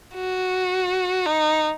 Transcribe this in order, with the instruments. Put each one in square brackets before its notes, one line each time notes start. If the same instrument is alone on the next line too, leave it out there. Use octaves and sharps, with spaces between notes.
[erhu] F#4
D#4